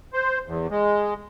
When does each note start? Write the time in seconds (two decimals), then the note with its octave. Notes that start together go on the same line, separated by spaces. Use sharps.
0.13 C5
0.47 E2
0.70 G#3